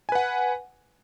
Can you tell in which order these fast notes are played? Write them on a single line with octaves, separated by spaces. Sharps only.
G#5 B4 F#5